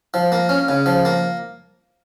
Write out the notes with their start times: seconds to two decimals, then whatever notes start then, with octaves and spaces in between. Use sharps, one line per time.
0.14 F3
0.32 A#3
0.49 C#4
0.68 C#3
0.86 F3
1.05 A#3